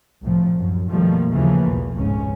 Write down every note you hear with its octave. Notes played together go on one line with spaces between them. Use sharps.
C2 A2 F3
F#2
B2 D#3 F3 G3 A3 A#3
D#2 C#3 E3 F3 A3 A#3
B1 E2
F1 C#2 G#2 C#4